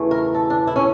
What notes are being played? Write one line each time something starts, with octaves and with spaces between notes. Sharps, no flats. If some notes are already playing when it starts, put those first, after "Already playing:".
Already playing: E2 C#3 E3 A3
A#4
A4
D4
E4
C#4